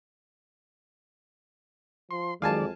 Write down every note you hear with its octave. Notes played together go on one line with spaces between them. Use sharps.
F3 C6
F2 D#3 F#3 G#3 D5 F5 G#5 A5